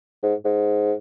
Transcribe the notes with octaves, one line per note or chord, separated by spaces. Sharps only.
G#2
G#2